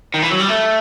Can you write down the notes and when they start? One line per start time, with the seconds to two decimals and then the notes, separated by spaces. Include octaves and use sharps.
0.14 D#3
0.22 E3
0.31 F#3
0.40 G3
0.49 A3